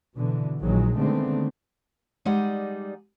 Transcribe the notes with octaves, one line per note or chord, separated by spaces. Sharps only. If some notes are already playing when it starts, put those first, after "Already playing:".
B2 D3 E3
A#1 D#3 F#3 G#3
D3 D#3 G#3 A3 B3 C4
G3 G#3 D#4 D5 F#5